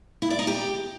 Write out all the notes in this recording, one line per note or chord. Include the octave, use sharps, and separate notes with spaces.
E4
D5
D#4
G4